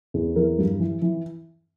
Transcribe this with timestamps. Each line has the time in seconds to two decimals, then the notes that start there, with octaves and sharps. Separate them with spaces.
0.14 E2
0.36 E3 A#4
0.58 G2
0.80 E3
1.02 E3